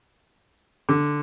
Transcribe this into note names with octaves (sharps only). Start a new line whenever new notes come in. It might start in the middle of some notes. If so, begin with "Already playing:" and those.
D3